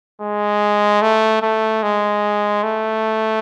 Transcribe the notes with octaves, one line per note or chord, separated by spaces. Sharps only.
G#3
A3
A3
G#3
A3